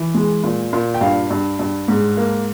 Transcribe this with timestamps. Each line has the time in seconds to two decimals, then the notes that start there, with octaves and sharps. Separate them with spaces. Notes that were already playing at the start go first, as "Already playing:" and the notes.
Already playing: E3
0.14 G#3
0.43 A#2
0.73 A#2
0.94 G5
1.01 G2 F5
1.30 G2
1.59 G2
1.88 G#2
2.17 A#3